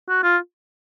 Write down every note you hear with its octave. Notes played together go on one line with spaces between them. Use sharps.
F#4
F4